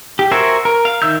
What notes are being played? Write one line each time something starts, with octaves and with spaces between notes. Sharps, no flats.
G4
F#4 A#4 C5 E5 G#5
A#4
F5
D#3 E5 E6 G6